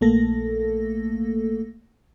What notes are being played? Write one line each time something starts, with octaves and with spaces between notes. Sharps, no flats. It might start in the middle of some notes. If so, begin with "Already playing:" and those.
A#1 A3 A#3 A4 A#6